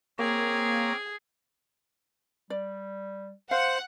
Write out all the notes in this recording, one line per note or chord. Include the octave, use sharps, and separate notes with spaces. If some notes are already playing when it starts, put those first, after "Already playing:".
A#3 C4 G#4 C#5 A#5 D6 F6
G3 D5
C5 F5 F#5